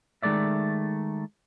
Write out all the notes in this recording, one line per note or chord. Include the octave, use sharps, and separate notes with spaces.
D#3 G#3 A3 D5 E5